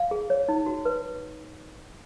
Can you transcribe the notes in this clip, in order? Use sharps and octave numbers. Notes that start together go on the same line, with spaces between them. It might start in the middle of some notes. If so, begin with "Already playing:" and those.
Already playing: F5
G#4
C#5
D#4
F#4
B4